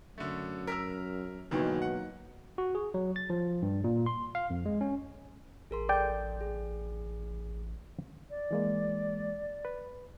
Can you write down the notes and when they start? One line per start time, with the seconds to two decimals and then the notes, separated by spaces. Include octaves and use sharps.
0.18 F#2 D3 A3
0.67 A#4 E6 F6 B6
1.51 D2 B2 D#3 E3 F#3 A#3 D#4
1.82 F#5
2.58 F#4
2.75 G#4
2.94 F#3
3.16 A6
3.30 F3
3.62 G2
3.84 A#2
4.06 C6
4.35 F5
4.50 F2
4.66 G#3
4.81 C#4
5.71 A1 G#4 A#4 C6
5.89 A4 D5 G5 G6
6.41 G#4
8.30 D5
8.51 E3 G#3 A#3
9.65 B4